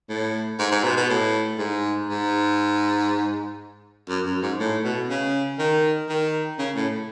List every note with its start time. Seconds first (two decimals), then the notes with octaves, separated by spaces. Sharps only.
0.09 A2
0.59 G#2
0.72 G#2
0.84 B2
0.97 B2
1.10 A2
1.59 G#2
2.09 G#2
4.09 F#2
4.26 F#2
4.42 G#2
4.60 A2
4.84 B2
5.09 C#3
5.59 D#3
6.09 D#3
6.59 C#3
6.76 A2